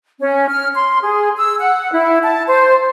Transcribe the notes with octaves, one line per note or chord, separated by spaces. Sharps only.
C#4
F6
C6
G#4
E6
F#5
E4
A5
C5